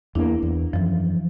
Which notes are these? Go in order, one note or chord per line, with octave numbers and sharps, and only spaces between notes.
E2 A#3 D4 E4
E2
F#2 E3 F3